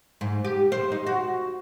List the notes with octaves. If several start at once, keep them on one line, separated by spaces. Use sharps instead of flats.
G#2
G4
C5
D#4
F#4